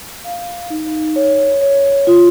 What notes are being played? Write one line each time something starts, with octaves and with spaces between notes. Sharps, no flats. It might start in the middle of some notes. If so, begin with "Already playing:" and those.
F5
D#4
C#5
C#5
F4